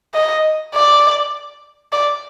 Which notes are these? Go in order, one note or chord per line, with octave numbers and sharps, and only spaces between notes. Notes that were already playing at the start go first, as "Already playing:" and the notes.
D#5
D5
D5